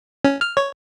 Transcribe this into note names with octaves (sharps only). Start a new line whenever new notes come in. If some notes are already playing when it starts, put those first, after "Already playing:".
C#4
F6
C#5